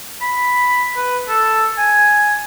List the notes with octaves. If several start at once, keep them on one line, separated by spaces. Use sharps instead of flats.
B5
B4
A4
G#5